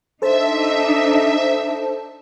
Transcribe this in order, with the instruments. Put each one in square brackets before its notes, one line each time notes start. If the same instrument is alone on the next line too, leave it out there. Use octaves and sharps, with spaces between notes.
[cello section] D4 D#4 [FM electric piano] A4 C5 A5 [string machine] E5